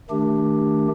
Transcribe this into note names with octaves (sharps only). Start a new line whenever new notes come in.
D#3 A3 D4 G4